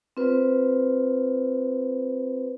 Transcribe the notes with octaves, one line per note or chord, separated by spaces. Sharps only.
C4 F4 B4 C5